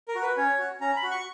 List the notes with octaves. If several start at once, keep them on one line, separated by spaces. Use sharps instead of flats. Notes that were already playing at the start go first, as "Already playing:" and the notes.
A#4
F#4
B4
C#4 C#5
F#4
C#4 A#5
B5
F#4
C#6